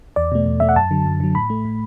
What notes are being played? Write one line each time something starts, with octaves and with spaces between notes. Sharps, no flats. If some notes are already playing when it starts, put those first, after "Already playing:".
E2 D5
B2 A3
E2
B2 A3 E5
F#5
F#2 A5
D3 F#3
F#2
D3 F#3
A2 B5
A3
A2